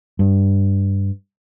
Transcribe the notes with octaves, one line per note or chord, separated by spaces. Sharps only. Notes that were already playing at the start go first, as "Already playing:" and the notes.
G2